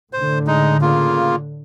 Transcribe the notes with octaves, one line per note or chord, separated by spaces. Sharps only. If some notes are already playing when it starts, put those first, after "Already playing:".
A2 D3 C5
G#3 D#4
C#3 A#3 F4